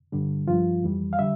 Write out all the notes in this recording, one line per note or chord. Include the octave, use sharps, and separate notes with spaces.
G2 D3 G3
G2 F3 F4
F2 E3 G3
F5
D3 G3 E5